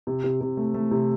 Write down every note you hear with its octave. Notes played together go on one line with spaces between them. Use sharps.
C3
C3
C3
A3
A3
C3